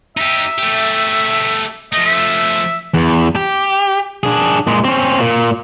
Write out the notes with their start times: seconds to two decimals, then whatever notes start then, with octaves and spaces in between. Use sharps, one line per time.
0.17 D#4 G4 E5
0.58 A3 G4
1.93 F3 A3 D#5
2.06 E5
2.94 E2
3.36 G4
4.23 D4 G#4
4.67 A#2 G#3
4.84 C4 C#4
5.20 A#2